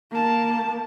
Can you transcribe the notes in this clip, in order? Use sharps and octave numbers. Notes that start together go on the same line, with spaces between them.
A#3 A5